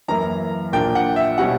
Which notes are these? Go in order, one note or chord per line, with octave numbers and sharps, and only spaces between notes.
F#2 E3 A#3 E4 A#5
A#1 A#2 A#3 D4 G5
F#5
E5
B2 G3 C#4 E4 F#5